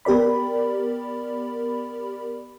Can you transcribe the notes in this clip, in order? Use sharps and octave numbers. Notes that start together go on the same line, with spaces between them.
B3 G4 A#4 D5 B5